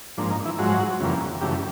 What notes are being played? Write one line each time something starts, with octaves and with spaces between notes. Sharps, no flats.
G#2 F3 A#3 D4
D#4
E3 E4
G#2 F3 F#3 G#3 F#4
F2 C#3 E3 G3 A#3
F#2 C#3 E3 G3 A3 G4